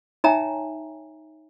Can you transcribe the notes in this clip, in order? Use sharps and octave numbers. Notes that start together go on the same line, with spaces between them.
D#4 C#5 E5 G5 G#5 A#5